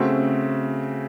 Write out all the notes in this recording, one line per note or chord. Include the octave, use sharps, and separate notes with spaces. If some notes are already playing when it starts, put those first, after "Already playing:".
Already playing: C#3 A3 C4 F#4